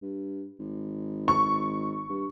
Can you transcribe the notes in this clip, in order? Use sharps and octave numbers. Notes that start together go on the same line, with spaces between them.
G2
G#1
C#6
G2